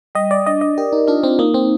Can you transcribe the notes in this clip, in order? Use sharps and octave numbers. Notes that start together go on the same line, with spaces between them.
G3 D#5
D5
D4 D#5
D#5
G4 A#4
D#4
D4 F4
C4
A#3 D#4
C4